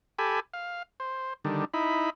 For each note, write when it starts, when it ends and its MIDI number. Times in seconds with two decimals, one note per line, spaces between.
0.18 0.40 67
0.18 0.40 69
0.18 0.40 80
0.18 0.40 83
0.54 0.83 77
1.00 1.33 72
1.45 1.65 50
1.45 1.65 51
1.45 1.65 55
1.74 2.10 63
1.74 2.10 64
1.74 2.10 83